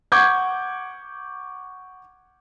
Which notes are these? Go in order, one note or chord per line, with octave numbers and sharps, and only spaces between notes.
F#5 C#6 D6 G6 G#6